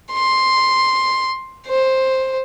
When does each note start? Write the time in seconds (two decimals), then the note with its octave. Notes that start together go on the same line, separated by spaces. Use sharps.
0.12 C6
1.67 C5